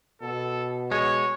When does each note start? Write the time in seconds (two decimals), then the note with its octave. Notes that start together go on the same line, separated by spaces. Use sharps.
0.22 B2 A4
0.92 G#3 C#5